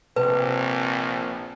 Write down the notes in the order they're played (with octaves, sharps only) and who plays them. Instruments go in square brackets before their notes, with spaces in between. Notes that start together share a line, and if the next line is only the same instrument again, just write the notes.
[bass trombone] A#1 [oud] C3 [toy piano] B4